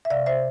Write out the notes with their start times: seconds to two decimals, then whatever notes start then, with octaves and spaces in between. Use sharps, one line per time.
0.05 E5
0.10 C3 D5 F5
0.26 C5 E5